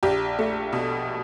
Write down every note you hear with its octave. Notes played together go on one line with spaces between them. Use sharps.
A#1 G4
A3
B2